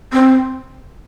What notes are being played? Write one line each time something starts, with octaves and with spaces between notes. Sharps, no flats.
C4